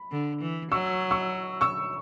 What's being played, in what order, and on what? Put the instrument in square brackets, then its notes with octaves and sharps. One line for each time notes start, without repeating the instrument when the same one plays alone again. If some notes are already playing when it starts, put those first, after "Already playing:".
Already playing: [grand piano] B5
[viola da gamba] D3
E3
[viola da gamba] F#3 [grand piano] C#6 E6
[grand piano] C#6 E6
C#6 E6